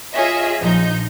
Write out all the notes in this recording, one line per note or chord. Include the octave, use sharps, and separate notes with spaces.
F4 G#4 C#5 D#5 E5
A#1 F3 D#4 G6